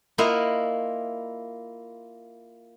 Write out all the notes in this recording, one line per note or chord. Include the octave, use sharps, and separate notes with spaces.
A#3 E4 F4 D#5 F5 F#5